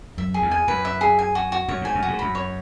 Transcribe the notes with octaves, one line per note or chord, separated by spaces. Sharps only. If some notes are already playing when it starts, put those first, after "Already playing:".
F#2 E5
G#4
E2
G#5
F#2 B4
E5
G#4
G#5
F#4
F#4
F#2 C#5
G#2 G#5
F#2
F#4
G#2
F#2 B5
C#5